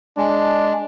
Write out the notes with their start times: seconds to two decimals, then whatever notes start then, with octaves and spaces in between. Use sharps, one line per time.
0.17 G#3 D4